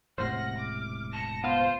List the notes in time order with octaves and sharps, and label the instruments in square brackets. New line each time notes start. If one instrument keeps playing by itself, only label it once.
[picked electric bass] E1 A2 C3 [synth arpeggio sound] C5 C7 [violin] F#5 A#6 [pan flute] F6
[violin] D6
[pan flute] A5 [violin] A#6 C#7
[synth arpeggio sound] B3 F5 [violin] F4 C5